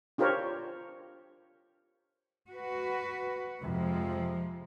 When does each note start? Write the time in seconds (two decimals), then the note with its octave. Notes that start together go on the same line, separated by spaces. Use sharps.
0.18 D4 F4 G4 A#4 C5 C#5
2.50 F#4 B4
3.61 F2 C3 F3 G#3